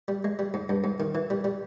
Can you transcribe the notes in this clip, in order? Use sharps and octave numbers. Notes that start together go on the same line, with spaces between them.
G3
G#3
G3
G#2
G2
G#2
D#3
E3
G3
G3